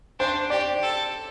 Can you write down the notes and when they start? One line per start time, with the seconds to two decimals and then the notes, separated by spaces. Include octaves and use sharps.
0.19 D4 C5
0.50 G4 D5
0.81 A4